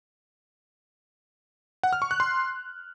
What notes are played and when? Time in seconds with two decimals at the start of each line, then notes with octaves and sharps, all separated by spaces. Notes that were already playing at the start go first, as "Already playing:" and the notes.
1.83 F#5
1.93 F6
2.02 C#6
2.11 F#6
2.20 C6